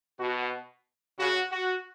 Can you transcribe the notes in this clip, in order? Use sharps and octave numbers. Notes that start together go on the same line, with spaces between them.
B2 F#4
C#3 F#4
F#4